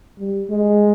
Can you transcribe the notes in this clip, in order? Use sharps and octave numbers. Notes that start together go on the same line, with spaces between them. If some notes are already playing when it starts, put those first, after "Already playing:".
G3
G#3